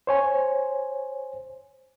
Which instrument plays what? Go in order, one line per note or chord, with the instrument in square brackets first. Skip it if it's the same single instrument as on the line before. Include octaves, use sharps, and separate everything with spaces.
[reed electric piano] C5 C#5 G#5